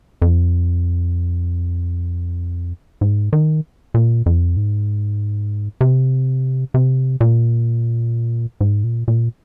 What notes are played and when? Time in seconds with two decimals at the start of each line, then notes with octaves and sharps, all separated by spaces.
0.22 F2
3.01 G#2
3.33 D#3
3.94 A#2
4.26 F2
4.57 G#2
5.81 C3
6.74 C3
7.21 A#2
8.61 G#2
8.84 A#2
9.08 A#2